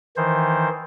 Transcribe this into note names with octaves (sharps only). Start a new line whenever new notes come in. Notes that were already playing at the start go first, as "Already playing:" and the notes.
D#3 E3 C5